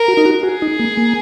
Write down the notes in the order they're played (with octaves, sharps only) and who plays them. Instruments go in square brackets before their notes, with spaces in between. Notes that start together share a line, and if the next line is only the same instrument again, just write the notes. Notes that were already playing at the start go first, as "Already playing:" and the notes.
Already playing: [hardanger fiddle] A#4
[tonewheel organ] F#4
D#4
F#4
[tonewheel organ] F#4 [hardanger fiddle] G#4
[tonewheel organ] D#4
A#3
A#3